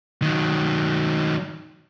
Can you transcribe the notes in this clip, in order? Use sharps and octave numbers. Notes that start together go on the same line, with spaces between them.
D#3 F#3